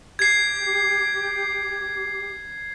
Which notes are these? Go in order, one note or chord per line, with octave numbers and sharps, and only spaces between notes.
G4 G#6 C7